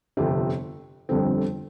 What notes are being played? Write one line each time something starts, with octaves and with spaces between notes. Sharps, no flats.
G1 F2 C3
G1 F2 D3 G3 C4